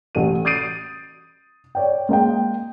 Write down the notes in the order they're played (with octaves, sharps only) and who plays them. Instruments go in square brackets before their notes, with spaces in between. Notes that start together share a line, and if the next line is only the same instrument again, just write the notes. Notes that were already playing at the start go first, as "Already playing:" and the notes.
[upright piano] A1 A4 D#7
D#6 G6 A6 C7 D7 D#7
C#5 D5 G5
G#3 A#3 D#5 G5